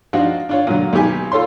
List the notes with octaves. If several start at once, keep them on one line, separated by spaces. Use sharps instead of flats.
F3 D4 D#4 F4 F#4
D4 F4 C#5
A#2 D3 F#3
B1 D#3 G4 G#5
F4 A4 C#5 C6